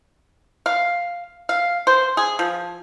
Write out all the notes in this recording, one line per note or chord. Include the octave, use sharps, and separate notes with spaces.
F5
F5
C5
G#4
F3